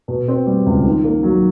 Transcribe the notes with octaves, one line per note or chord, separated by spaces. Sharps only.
B2
C4
G3
C#2
D#3
A#3
F#3